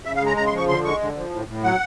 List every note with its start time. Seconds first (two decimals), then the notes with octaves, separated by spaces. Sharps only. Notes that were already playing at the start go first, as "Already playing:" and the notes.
0.05 C#3 E5
0.15 F5
0.21 G#3
0.26 A#5
0.37 C#3 A#5
0.47 C6
0.52 F3
0.57 C#6
0.68 D3 C6
0.84 G#3 C#6
1.00 D3
1.16 F3
1.32 A2
1.48 A2
1.64 F#3 F#5